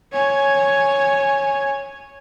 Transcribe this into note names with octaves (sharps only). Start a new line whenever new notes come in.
C#5 G#5